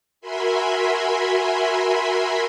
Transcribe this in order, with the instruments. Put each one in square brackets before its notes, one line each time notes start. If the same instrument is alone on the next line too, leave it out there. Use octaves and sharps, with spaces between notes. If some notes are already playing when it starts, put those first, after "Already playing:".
[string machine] F#4 A#4 E5 G#5 B5 C6